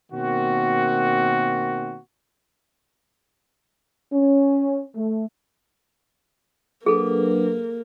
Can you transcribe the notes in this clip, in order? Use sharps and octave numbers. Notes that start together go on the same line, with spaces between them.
B2 D#3 A#3 C4 F#4
C#4
A3
F#3 A#3 D4 G#4 A4 B4